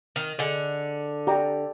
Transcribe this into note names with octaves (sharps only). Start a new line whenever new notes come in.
D#3
D3 G#4 D#5 G#5
G4 D5 G5 A#5